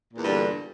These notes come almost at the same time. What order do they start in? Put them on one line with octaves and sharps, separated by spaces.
A#2 E2 G2 D3